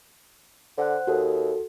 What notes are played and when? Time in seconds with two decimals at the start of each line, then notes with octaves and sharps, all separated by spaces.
0.78 D3 C5 F#5 F#6
1.07 D#2 F#4 A4